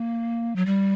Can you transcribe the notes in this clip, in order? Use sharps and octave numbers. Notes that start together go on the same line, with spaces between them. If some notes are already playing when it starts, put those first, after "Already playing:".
Already playing: A#3
F#3
G3